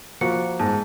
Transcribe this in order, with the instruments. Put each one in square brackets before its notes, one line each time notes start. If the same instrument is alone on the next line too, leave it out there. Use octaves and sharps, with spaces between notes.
[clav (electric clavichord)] F3 A#3 F#4 [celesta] C#7
[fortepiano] G#2 [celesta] A5